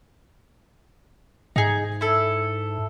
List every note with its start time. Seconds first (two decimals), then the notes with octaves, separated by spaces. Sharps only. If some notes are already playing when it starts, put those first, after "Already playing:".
1.56 G#2 D#4 G#4
2.01 E4 A4